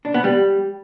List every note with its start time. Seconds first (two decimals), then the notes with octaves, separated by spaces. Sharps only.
0.05 D4
0.14 B3
0.24 G3